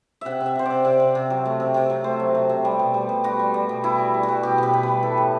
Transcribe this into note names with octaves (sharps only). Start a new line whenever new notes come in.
C3 E5 F#5
C3
E5
C3 C5
C3 D5
C3
C3
C3
F#3
A3
C3
C3
F#3
A3 C5
F#3
C3
C3
G3
B2
G3
B2
G3 F#4
G3
G3
B2
B2 E4
G3
G3
F#4
G3
B2 G4
B2 B4
B2
G3 B4
E3 A4
A2